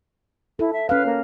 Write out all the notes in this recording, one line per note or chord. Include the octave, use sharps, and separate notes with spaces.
E4 A4
E5
C#4 B4 F5
A#3